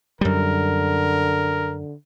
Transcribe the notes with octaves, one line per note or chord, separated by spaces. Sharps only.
F#2 D3 G3 A#4